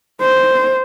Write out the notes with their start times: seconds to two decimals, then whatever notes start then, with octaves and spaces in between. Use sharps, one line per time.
0.21 C5